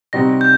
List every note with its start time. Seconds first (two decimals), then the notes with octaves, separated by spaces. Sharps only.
0.13 C3 G3 C4 D#4 F#4 A#6
0.41 G6